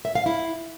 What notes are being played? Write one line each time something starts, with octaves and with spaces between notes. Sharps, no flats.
E5
F5
E4